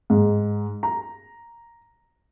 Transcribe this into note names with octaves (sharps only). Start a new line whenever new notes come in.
G#2
A#5